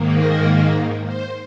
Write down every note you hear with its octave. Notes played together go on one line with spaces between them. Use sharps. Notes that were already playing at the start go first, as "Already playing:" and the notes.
Already playing: G#2 D#3 A#3
A#4
C5